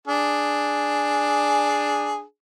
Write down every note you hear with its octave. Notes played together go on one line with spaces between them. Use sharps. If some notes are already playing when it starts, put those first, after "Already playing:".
D4 G#4